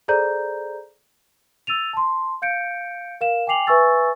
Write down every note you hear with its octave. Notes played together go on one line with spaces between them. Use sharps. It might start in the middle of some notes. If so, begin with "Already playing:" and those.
G#4 A4 C5 D5 A#5 G6
E6 A6 D#7 F7
A5 C6
F5 G6 C#7 D7
A#4 F5 E7
G5 G#5 D6 C7 F7 F#7
B4 E5 G#5 C#6 E6 A6